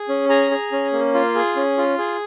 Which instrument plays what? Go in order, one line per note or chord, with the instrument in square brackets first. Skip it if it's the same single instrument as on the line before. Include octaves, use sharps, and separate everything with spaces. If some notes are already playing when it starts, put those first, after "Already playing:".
Already playing: [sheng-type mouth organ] G#4
C#4
G#4 A#5
G#4
C#4
A#3
F4
G#4
C#4
F4
G#4